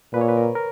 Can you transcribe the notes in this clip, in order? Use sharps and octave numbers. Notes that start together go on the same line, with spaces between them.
A#2 B4
C#5
B4
A#4
A#4